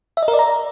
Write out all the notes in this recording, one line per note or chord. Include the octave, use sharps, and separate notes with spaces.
E5
D#5
A#4
D5
A#5